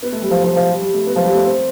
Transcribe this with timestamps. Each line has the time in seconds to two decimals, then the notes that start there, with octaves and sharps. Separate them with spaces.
0.03 B3
0.12 A3
0.22 G3
0.31 F3
0.44 F3
0.56 F3
0.69 G3
0.81 G3
0.94 A3
1.07 B3
1.16 F3
1.25 G3
1.35 A3
1.45 C4